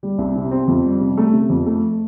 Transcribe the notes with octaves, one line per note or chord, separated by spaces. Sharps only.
G3
C2
C3
C4
F2
G3
C3
A3
C3
F2
A3